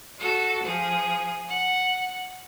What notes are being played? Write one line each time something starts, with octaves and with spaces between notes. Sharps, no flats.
F#4 A4
F3 G#4
F#5